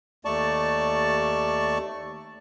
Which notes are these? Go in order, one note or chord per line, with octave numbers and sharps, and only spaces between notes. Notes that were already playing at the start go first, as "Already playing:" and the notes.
D#2 A3 D5 A5 C#6